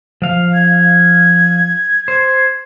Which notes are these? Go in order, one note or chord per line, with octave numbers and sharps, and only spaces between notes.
F3 F5
G#6
C5 G#6